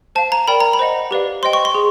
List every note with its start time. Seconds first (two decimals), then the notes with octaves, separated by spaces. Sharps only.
0.15 C5 F5 A5
0.32 A#5
0.48 A#4 D5 G5 B5
0.60 A#5
0.73 B5
0.79 C5 D#5 F#5
1.11 G4 B4 D5 F5
1.43 C5 D#5 G5 C6
1.53 C#6
1.65 C6
1.75 G#4